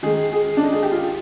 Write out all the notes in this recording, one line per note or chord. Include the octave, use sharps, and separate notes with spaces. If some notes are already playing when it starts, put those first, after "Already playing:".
D#3 G#3 G#4
G#4
D4
D#4
G#4
G4
F4